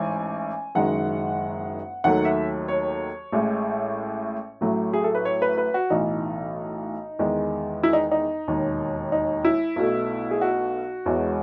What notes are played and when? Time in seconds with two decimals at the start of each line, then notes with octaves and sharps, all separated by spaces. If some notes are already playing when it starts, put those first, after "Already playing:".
Already playing: A1 G#2 E3 G#5
0.75 F#1 F#2 D#3 G#3 F#5
2.04 D#2 D#3 F#3 A3 F#5
2.25 E5
2.68 C#5
3.32 A1 A2 G#3
4.61 A1 A2 F#3 A3
4.93 G#4
5.04 A4
5.15 B4
5.25 C#5
5.42 B4
5.58 B4
5.74 F#4
5.90 B1 A2 E3 D#4
7.19 E2 D#3 G#3
7.83 E4
7.93 D#4
8.11 D#4
8.47 E1 D#2 D#3
9.12 D#4
9.45 E4
9.76 B1 B2 A3
10.31 G#4
10.41 F#4
11.05 E1 E2 B2 G#3